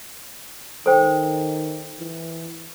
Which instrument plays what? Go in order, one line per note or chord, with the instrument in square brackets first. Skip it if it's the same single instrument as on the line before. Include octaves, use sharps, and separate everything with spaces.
[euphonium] D#3 [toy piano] A4 C5 G5
[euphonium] E3